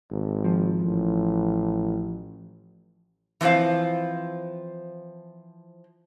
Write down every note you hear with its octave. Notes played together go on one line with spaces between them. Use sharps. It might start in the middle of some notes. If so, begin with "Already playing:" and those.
G#1
F3
A1
E3 F3 C4 C5 F5